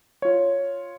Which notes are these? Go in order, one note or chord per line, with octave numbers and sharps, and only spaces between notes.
F4 C#5